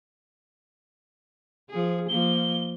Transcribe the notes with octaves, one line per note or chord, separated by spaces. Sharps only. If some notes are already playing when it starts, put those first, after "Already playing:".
F3 G#4
F3 A#3 G7